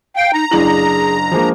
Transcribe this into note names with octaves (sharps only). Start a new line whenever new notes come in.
F5 G5
D#4 A#5
F#1 D4 E4 G#4 F#7
F3 G#3 A#3 D4